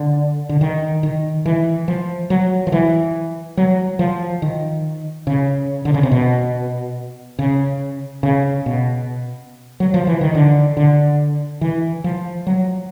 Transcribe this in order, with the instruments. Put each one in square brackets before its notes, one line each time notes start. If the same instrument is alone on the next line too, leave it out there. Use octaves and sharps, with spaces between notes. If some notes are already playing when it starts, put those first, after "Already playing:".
Already playing: [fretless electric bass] D3
D3
D#3
D#3
E3
F3
F#3
F3
E3
F#3
F3
D#3
C#3
D3
C#3
C3
B2
C#3
C#3
B2
F#3
F3
E3
D#3
D3
D3
E3
F3
F#3